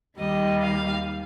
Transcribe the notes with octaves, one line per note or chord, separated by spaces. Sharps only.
D#2 D#3 G3 D#5
F5